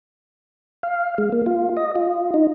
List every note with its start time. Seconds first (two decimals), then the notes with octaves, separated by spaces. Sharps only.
0.83 F5
1.18 G#3
1.32 A#3
1.46 F4
1.77 D#5
1.95 F4
2.34 D#4